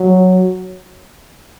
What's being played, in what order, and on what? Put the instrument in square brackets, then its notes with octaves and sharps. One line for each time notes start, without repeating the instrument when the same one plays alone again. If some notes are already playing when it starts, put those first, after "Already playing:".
Already playing: [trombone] F#3